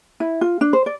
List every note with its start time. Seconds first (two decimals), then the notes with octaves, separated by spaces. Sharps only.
0.20 E4
0.41 F4
0.61 D4
0.73 C5
0.86 D5